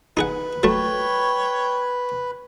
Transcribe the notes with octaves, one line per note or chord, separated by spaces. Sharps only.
D#4 G#4 B4 F#5 B5
F#3 A3 C#5 G5 A5